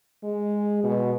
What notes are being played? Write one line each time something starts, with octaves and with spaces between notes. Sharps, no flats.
G#3
B2